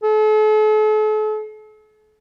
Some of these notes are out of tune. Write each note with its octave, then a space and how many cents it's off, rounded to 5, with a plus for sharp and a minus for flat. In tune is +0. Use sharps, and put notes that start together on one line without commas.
A4 -40